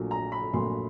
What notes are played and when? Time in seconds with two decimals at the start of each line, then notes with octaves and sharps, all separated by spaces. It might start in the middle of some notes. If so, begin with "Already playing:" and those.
Already playing: A#1 A#2 F#3 A3
0.11 A#5
0.32 B5
0.53 A#1 A#2 F#3 A3 C6